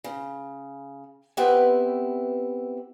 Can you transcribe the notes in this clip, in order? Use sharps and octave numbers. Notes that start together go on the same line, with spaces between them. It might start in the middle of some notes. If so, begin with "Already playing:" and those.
C#3
B3 C4 E4 G4 B4 E5